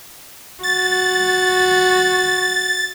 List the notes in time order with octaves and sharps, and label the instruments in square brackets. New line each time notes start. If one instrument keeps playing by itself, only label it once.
[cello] F#4 [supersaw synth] A6